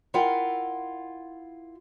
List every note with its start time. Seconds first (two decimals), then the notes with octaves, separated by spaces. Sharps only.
0.14 E4 F4 A#4 E5 F#5 G5